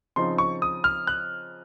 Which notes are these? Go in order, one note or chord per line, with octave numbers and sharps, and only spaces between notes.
C#3 F3 C4 D#4 C6
C#6
D#6
F6
F#6